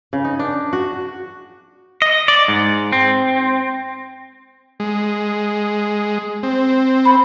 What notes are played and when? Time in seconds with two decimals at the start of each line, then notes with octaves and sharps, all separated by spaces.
0.13 C#3
0.25 D#4
0.39 D4
0.73 F#4
2.02 D#5
2.28 D5
2.48 G#2
2.92 C4
4.80 G#3
6.43 C4
7.06 B5